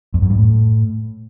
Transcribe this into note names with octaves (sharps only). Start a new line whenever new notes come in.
F2
F#2
G2
A2